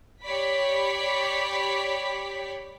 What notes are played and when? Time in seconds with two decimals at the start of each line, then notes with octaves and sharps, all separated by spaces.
0.23 G4 C#5 D5 B5 B6